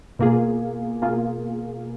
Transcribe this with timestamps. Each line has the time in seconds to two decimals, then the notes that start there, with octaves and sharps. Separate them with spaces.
0.19 B2 A#3 F4 G#4
1.02 B2 A#3 F4 G#4